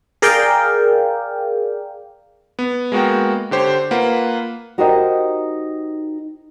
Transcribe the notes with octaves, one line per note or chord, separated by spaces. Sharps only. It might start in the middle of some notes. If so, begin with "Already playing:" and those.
G#4 A#4 D5 F5 G5
B3
G#3 A#3 B3 F#4 A#4 G5
D3 G4 C5 C#5
A#3 F4 B4 F#5
D#4 F#4 G4 A#4 C5 D#5